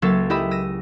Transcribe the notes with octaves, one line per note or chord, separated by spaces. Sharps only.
C#2 F#3 A#3 A4 E5 A6
E4 G4 D#5 E5 B5
E6 A#6 D#7